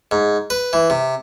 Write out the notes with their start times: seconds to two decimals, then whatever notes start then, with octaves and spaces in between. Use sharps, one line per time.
0.11 G#2
0.50 B4
0.73 E3
0.90 C3